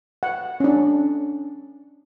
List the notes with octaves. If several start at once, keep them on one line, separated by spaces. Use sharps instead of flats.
F#5
C#4 D4